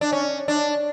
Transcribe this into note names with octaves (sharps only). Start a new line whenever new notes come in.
D4
C#4
D4